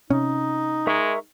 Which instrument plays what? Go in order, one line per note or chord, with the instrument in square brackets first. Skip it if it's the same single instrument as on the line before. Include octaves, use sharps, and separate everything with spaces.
[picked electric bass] C3 C#4 [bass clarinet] D#4
[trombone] G#3 [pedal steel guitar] A#4 E5 C#6